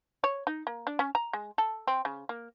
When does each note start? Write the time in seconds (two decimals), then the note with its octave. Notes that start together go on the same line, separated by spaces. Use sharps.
0.24 C#5
0.47 D#4
0.67 A#3
0.87 D4
0.99 C#4
1.15 A#5
1.33 G#3
1.58 A4
1.88 C4
2.05 C#3
2.29 A#3